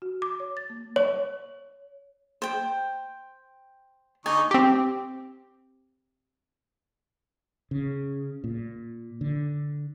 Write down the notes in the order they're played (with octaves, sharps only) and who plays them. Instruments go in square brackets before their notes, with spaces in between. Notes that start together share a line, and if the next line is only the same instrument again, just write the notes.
[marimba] F#4
D6
C#5
A6
A#3
[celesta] C#5
[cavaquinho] C5 G5
[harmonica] D3 D#4 C#6 [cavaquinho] G#5
[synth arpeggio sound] C4 G4
[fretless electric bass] C#3
A#2
D3